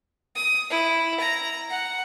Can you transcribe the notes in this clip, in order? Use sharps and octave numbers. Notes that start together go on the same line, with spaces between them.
D#6
E4
A#5
F#5